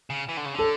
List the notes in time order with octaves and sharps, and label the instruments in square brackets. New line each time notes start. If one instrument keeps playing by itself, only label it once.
[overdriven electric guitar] C#3
E3
D3
C#3
[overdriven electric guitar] D3 [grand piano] A4